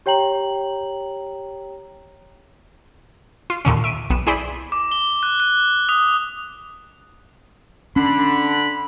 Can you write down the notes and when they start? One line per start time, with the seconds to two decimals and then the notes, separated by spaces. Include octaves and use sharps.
0.06 G4 C#5 G5 A#5 F#7
3.50 F4
3.65 D#2 A#2 D3 C#4
3.84 E5 D7 D#7
4.10 B1 B3 E7
4.27 E4 G#4 C5 D5 B5
4.72 D6
4.92 G7
5.23 F#6
5.40 F#6
5.89 D#6
7.96 D3 C#4 B5